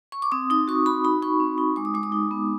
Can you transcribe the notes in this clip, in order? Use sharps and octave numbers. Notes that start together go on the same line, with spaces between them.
C#6
D6
C4 D#6
D#4 D#6
F#4 C#6
F#4 B5
D#4 B5
D#4 C#6
C4
D#4
G#3 D6
D#6
G#3 D6
D#6
D#4
B3